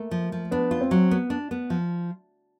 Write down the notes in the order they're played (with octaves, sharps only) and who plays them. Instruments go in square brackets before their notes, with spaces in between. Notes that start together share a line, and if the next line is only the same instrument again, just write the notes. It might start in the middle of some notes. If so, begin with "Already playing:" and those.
Already playing: [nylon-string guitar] A3 [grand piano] A#3
[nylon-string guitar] F3
F3
[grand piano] B3 [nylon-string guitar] D4
[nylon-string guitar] F4
[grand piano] C4
[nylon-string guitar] F#3
B3
D4
B3
F3